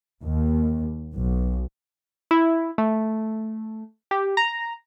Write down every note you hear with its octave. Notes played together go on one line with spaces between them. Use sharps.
D#2
B1
E4
A3
G4
A#5